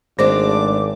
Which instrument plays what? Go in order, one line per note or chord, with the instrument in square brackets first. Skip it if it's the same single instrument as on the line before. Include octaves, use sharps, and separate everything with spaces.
[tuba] G#1 [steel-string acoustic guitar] G#3 A3 D4 [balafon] C5 [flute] D6